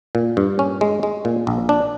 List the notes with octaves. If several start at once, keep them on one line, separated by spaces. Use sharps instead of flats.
A#2
G2
C#4
G#3
G#3
A#2
A#1
D4